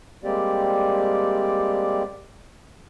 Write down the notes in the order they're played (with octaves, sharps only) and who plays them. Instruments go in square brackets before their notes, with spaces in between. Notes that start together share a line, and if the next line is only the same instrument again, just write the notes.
[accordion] G3 G#3 A#3 C4 G4 D5